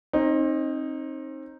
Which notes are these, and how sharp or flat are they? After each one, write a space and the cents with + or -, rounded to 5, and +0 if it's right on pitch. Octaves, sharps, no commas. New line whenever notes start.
C4 +35 D#4 +0